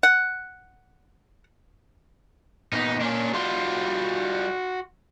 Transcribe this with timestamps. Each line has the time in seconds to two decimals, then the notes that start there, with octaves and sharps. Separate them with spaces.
0.03 F#5
2.73 A#2 B3 D#4
3.01 A#2 A#3 C#4 D4
3.34 G3 F4 F#4 C6